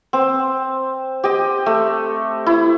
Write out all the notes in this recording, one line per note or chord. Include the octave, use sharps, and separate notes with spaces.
C4
G4 D#5
A3
E4